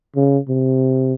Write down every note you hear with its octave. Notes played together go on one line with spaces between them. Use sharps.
C#3
C3